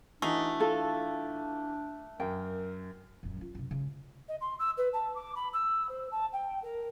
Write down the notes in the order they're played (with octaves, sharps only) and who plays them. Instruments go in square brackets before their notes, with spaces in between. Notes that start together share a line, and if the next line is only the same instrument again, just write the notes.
[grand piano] E3 F#4 F7 [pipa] A3 G#4 [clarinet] D4 [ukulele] D#4
[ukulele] F4 A4
[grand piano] F#2 [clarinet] A#4 [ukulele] G5
[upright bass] D#1 F#2
C#4 F4
F#2 C3
C#3 G#3
[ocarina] D#5
C6
E6
B4
A5
D6
B5
E6
C5
A5
G5
A#4